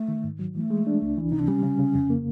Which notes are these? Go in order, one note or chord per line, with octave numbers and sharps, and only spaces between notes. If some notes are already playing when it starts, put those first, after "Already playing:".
Already playing: A3
D#3
G#2
F#3
E3 A3
G#3
D4
C#2
E3
C3 D#4
D4
G3 C#4
C#3
C#3
F2
A#3